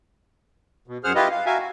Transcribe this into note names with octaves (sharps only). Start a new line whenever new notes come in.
B2
F#2 G#4 C5 F#5 F6
E4 F4 G4 B4 D#5
F5
F#4 A#4 E5 F5 G#5
F#4